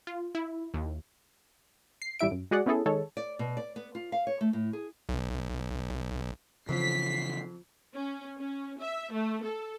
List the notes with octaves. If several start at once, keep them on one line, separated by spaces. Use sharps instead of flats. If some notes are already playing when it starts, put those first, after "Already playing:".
F4
E4
D#2
C7
A1 G3 E4 E5 D7
F#2
G#3 F#4 G#4 D5 F#5
B3 C#4 E4 G#4 A4
D#3 G#3 A4 C#5
D5
B2
D5
B3
F4
F5
C#5
A3
A2
G#4
B1
F2 C#3 E3 B6 C7
C#4
C#4
E5
A3
A4